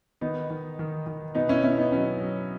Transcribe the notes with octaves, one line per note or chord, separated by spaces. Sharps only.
D#3 B3 D#4
D#3
D#3
D#3
B2 B3 D#4
C#4 E4
B2 C#4 E4
B3 D#4
F#3 C#4
F#3